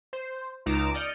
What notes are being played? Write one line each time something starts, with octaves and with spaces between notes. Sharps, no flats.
C5
C#2 D#4 A#5 D6 D7 E7
D5 D#5 F6 G6 C#7